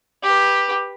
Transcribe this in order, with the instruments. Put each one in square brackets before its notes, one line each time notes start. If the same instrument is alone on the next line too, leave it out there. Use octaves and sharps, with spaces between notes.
[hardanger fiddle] G4 B4